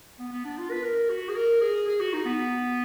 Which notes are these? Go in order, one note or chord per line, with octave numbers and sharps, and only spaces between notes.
B3
B3
D4
F4
B4
A#4
F#4
G#4
A#4
G#4
G#4
F#4
D#4
B3